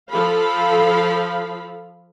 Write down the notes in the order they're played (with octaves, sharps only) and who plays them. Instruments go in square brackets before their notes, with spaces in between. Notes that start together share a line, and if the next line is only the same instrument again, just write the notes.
[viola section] F3 A4 F5 B5